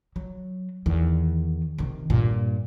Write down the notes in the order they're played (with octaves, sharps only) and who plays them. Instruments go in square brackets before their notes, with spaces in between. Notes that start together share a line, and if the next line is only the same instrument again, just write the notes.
[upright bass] F#3
E2 D#3
C3 D#3
G2 A#2